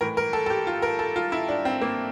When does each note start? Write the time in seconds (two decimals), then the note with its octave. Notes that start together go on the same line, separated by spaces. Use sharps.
0.01 A2 E3 A#4
0.17 A#4
0.33 A4
0.46 A4
0.50 G4
0.67 F4
0.82 A#4
0.99 A4
1.16 F4
1.32 E4
1.48 D4
1.65 C4
1.82 A#3